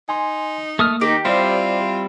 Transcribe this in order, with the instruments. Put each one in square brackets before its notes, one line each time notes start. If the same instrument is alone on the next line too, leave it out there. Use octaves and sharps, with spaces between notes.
[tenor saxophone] D#4 [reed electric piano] G#5 C6
[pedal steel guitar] A3 D#6 F6 [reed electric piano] A#3
[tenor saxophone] D#3 [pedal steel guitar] D#4 [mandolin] G4
[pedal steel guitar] G3 C4 E4 [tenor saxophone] F4 [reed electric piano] C5 D5